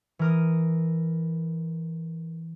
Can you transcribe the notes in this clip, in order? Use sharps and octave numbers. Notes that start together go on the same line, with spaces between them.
E3 A#4 D#6